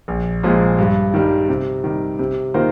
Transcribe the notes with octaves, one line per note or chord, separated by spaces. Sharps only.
A#1
A#2 F3 G#3
G2
D#3 G3
C3
D#3 G3
C3
D#3 A#3 F4 C5